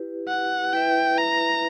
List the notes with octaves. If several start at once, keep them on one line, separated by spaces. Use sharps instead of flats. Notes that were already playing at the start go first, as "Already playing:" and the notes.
Already playing: E4 G4 B4
F#5
E4 B4 E5 G5
A#5